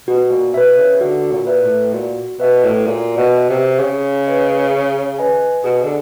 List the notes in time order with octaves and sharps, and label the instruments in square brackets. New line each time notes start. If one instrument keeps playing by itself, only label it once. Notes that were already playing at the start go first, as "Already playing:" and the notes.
[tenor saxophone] B2 [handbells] F#4
[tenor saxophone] A#2
[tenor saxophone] B2 [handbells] B4 E5
[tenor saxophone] C#3
[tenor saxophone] D3 [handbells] F#4
[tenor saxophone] A#2
[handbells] B4 E5
[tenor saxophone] A2
[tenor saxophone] A#2 [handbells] F#4
[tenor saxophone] B2 [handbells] B4 E5
[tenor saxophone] A2
[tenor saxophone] A#2 [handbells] F#4
[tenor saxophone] B2
[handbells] B4 E5
[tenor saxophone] C3
[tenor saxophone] C#3 [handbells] G#4
[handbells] B4 D#5 G#5
G#4
B4 D#5 G#5
[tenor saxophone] B2 [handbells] G#4
[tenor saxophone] D3